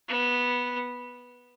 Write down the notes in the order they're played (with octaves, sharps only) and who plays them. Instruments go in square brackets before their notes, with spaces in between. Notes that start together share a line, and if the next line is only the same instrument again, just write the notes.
[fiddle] B3